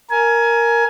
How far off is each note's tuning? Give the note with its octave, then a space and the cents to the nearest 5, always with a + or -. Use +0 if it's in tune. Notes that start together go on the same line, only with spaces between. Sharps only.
A#4 +0 G#5 +20